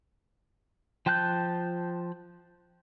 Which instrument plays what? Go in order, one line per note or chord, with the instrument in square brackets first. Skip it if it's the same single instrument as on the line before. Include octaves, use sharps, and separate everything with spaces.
[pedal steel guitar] F3 G5 A5 F#6 G6